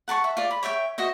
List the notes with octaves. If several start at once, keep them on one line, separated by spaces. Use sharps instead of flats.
F#5 A5 C6 C#6
E5
F4 D5
B5
C#5 D5 E5 G5
F#4 C5 D#5 E5